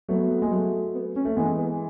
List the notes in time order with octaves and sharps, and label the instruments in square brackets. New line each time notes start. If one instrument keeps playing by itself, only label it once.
[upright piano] F#3 A3 [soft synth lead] B3
[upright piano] G#3
F#3 A3
[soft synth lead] B3
C#4
[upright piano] A3
[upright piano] E3 G#3 [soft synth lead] B3
[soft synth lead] B3